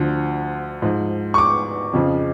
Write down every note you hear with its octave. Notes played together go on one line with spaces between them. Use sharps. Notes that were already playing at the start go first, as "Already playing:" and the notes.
Already playing: D2 D3 F3
G#2 F3
C#6
D6
F2 C#3 F3